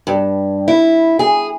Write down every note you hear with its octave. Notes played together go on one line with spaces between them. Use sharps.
G2
E4
G#4